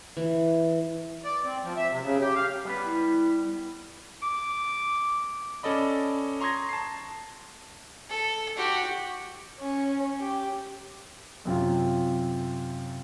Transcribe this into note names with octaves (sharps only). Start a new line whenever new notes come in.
E3
D5
C4
F3
E5
C3
C#3
G4
F5
G3 B3 B4
E4
D6
C#4 A4 D5 D#5 B5
A#5 C6 C#6 D#6 G#6 A#6
A5 C7
A4
F#4 G4
C#4
G4
F#2 C3 F4